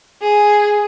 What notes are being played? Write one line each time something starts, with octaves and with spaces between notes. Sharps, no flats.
G#4